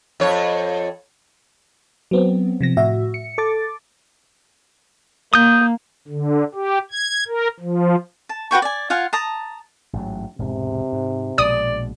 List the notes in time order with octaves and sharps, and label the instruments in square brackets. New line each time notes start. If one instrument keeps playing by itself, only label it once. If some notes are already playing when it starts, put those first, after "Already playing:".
[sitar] F2 C#5
[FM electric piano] F#3 B3 C4
C3 F3 A#6
A2 F#4 E5
C#7
A4 D6 A6
[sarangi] A#3 [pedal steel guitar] D#6 G6
[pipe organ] D3
G4
G#6
A#4
F3
[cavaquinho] A5
F#4 B4 G5 C#6
D5 G#5
F4 F5 F#5 G#5
A5 A#5 D#6
[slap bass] A1 G#2 F#3
[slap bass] E1 G#2 [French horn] C3
[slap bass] G#2
[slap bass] A#1 B2 G#3 [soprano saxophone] D5 [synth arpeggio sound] D#6